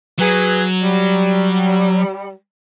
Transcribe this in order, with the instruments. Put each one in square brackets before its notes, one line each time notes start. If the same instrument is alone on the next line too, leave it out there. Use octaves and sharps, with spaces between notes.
[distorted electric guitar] F#3 [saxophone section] G#4 B4
[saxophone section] G3